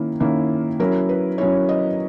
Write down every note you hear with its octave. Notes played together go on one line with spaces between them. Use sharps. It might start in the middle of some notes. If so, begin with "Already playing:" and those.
Already playing: D#3 A#3 C#4 E4
D#3 A#3 C#4 E4
F#3 C#4 E4 A#4
B4
F#3 C#4 E4 C#5
D#5